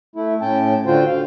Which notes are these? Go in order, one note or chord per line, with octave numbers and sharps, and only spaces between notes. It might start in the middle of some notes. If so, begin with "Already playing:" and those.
A3 E4
A2 C#4 G5 A5
D3 F4 F#4 C5 G5
F5